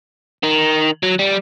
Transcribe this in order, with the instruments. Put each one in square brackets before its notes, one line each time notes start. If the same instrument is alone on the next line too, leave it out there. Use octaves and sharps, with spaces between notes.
[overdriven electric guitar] D#3
F#3
G3